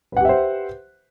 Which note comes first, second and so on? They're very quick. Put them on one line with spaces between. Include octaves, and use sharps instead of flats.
B4 F#5 G4 E5 C5